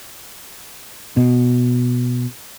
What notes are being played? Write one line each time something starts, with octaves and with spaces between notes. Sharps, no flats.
B2